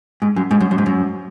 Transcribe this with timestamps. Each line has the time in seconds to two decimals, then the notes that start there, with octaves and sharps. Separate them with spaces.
0.22 G#2
0.36 F#2
0.51 G#2
0.61 F#2
0.71 F#2
0.78 G#2
0.86 F#2